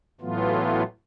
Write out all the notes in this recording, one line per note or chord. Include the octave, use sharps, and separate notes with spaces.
A2 E3 F#3 A3 B3 F4